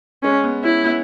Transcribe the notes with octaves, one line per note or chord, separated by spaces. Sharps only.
G#3 C#4
B3
C#4 E4
B3